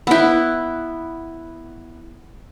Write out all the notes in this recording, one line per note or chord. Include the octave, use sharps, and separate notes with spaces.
B3 E4